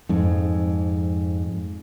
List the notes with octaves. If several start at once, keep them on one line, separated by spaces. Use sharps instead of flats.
F2 G#2